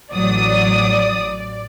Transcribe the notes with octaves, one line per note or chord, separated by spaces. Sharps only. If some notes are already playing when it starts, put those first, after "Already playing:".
A1 F#3 D5 D#6